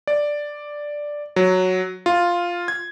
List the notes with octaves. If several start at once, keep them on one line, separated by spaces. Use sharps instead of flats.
D5
F#3
F4
G#6